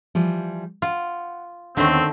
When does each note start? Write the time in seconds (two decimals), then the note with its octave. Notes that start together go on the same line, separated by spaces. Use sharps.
0.15 E3 F3 G3
0.82 F4 F#5
1.77 D#2 D3 D#3 A3 B3 C4